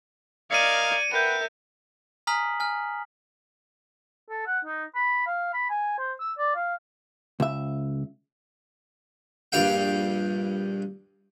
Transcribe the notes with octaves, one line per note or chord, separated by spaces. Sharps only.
A#4 D5 D#5 F5 G#6 C#7 D#7
A#4 B4 E5 F#5 G5 G6 D#7
G#5 A#5 D#6 F6 B6 F#7
G#5 F6
A4
F#5
D#4
B5
F5
B5
G#5
C5
E6
D5
F5
C#2 E5
A#1 G2 F5 G5